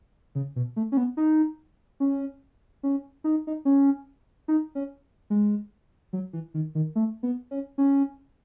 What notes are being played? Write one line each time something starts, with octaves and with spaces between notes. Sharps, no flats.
C#3
B2
A3
C#4
B3
D#4
C#4
C#4
D#4
D#4
C#4
D#4
C#4
G#3
F#3
E3
D#3
D#3
A3
B3
C#4
C#4